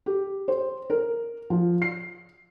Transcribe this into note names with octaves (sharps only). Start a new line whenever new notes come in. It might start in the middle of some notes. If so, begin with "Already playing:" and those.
G4
C5
A#4
F3
C7